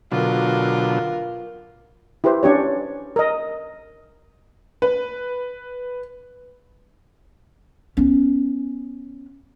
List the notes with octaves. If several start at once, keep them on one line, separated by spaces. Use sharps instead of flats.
B2 D3 F#3 F4 A#4
E4 G4 B4 C5
C#4 D4 G4 C#5
A#4 D#5
B4
B3 C#4